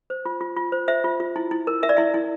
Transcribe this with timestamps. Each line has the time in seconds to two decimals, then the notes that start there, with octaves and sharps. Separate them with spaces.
0.10 C5
0.25 F4
0.41 F4
0.56 F4
0.72 C5
0.88 C5 E5
1.04 F4
1.20 F4
1.36 E4
1.51 E4
1.67 A#4
1.83 A#4 E5
1.89 D5
1.97 E4 E5
2.14 E4